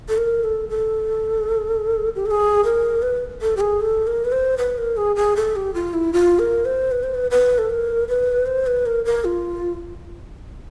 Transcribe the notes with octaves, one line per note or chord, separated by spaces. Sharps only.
A4
A#4
A4
A4
G4
A4
G#4
A#4
B4
A4
G4
G#4
A4
A#4
B4
C5
B4
A#4
G#4
G#4
A4
G4
F4
E4
F4
A#4
C5
B4
C5
B4
B4
A4
A#4
B4
C5
B4
A#4
A#4
F4